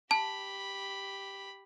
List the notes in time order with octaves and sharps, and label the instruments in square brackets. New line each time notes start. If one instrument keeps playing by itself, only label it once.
[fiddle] G4 B5 [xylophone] A5